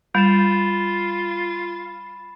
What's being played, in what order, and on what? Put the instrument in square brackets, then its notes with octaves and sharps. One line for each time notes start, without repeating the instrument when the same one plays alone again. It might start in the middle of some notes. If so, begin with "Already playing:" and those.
[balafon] G3 [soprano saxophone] F4 [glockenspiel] B5 A6 E7